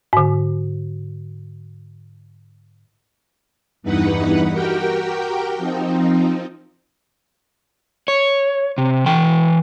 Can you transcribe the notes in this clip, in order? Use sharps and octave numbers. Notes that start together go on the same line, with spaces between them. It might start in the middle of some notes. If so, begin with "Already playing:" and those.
G#2 D3
E2 G2 E3 D#4 B4 F#5
F#4 G4 A#4 G5
F3 C4 D#4
C#5
C3
E3 G5